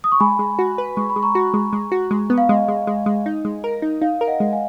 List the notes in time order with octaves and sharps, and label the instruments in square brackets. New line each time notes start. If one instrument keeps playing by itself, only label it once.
[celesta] D#6
C#6
[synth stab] G#3 [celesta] G#5 B5
[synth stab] G#3
F#4
B4
[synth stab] G#3 [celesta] C#6
[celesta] B5
[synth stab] G#3
[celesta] A#5 C#6
[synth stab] F#4
G#3
G#3
F#4
G#3
B3
[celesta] F5
[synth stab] G#3 [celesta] D#5
[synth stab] G#3
G#3
G#3
D#4
G#3
A#4
D#4
[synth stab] D#4 [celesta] F5
[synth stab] A#4
[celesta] D#5 F#5
[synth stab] G#3
[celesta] F5 G#5